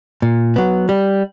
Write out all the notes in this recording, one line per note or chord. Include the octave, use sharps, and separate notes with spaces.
A#2
F#3 B3
G3